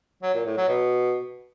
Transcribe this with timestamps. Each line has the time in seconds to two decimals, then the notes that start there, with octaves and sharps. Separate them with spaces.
0.23 F#3
0.34 A#2
0.45 A2
0.57 F#3
0.68 B2